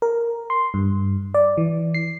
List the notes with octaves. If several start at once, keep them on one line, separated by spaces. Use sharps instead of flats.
A#4
C6
G2
D5
E3
C7